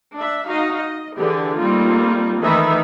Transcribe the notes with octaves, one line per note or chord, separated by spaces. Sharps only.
D4 E5
D#4 F#4 D#5 F5
D#5
D3 E3 G4 G#4 D5
G3 A3 A#3 C4 D#4 F4
D#3 E3 A3 D#4 E5 B5